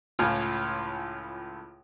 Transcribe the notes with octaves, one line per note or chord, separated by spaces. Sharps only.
C#2 A2 F4 G#5 F6